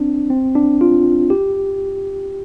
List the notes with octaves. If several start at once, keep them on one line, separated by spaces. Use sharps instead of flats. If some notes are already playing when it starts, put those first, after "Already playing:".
Already playing: C4 D4
C4
D4
F4
G4